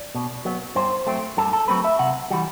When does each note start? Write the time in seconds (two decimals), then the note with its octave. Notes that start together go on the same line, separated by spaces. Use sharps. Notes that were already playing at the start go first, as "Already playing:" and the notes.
Already playing: D5
0.15 B2
0.45 F#3 B3
0.75 G2 C5
1.07 F#3 A3 C4
1.37 G2 A4
1.53 A4
1.68 F#3 A3 C4 B4
1.84 E5
1.99 C3 F#5
2.31 E3 G3 F#4